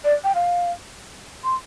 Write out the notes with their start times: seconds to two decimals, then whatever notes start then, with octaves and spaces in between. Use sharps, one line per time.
0.04 D5
0.24 G5
0.35 F5
1.44 C6